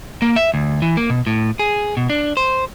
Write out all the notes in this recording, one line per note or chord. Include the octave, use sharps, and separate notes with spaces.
A#3
E5
D2
E3
A#3
B2
A2
G#4
B2
D4
C5